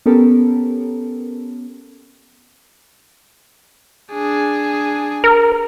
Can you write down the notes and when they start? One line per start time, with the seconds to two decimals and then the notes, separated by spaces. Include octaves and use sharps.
0.06 B3 C#4 G4 A4 A#4
4.12 D4 G#4
5.24 A#4